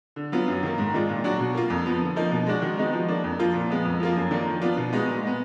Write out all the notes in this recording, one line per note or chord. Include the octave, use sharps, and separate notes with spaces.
D3
F#3 B3 F4
F#2
D#3 A#3
G#2
D#3 G#3 D4 F4
A#2
F#3 D4 F#4
B2
A#3 F4
F2
F3 B3
D3
F3 A#3 D#4
B2
G#3 D4 F#4
D#3
G#3 B3 D#4 F#4
F3
A#3 D4
F2
F3 A#3 F4
A#2
F3 G#3 B3
F2
F3 A#3 F4
F#2
D#3 A#3 D4
F3
B3 D4 F4
B2
G#3 B3 D#4 F#4
A#2
G#3 B3